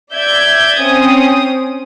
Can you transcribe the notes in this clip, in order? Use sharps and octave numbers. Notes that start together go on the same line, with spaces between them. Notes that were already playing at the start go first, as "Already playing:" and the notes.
D5 E5 G6 G#6
C4 C#4 D#6